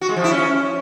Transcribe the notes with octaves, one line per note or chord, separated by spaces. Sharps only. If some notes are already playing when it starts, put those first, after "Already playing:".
F#4
G#3
F3
E4
C#4